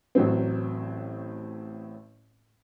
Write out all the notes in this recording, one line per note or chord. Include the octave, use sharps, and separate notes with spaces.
A1 A2 F#3 C4